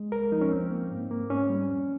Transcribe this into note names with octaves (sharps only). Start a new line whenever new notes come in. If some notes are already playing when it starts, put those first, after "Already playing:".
Already playing: G#3
C2 A#4
F3 D#4
C#4
F2 C4
A#3
G#2
A#3
G#2 C#4
G3
F2